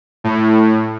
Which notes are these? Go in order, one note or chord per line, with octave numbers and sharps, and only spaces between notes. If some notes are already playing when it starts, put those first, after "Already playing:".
A2